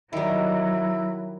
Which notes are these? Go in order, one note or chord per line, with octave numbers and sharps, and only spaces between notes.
D#3 F#3 G3 E4